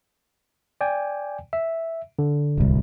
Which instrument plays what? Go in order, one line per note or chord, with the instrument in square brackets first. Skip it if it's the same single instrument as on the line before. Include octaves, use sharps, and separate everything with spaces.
[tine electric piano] D5 G5 G#5
E5
D3
[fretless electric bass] D1 C2